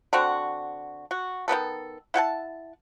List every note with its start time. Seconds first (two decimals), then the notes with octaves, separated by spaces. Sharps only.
0.13 D3 C4 F#4
1.11 F#4
1.48 D#3 G3 B3 A4
2.14 E4 F#5 G5 A5